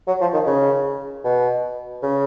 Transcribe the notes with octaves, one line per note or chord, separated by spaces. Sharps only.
F#3
F3
D#3
C#3
B2
C#3